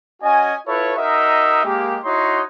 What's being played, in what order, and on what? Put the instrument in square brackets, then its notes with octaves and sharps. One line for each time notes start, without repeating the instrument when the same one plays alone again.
[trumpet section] C#4 F#4 D#5 G#5
E4 F4 A4 B4 C#5
D#4 F#4 A#4 D#5 E5
G#3 A#3 G4
D#4 E4 F#4 C#5 D#5 C6